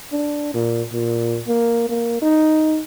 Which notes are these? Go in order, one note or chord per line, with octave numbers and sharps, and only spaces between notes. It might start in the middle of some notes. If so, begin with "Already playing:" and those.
D4
A#2
A#2
A#3
A#3
D#4